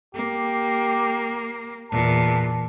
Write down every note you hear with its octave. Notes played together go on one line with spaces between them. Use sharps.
A#3 G4
E2 A#2 A5